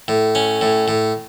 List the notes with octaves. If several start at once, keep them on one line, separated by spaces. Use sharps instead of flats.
A2
C#4
A2
A2